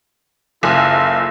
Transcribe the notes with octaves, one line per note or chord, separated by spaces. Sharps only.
F#1 E4 F4 A4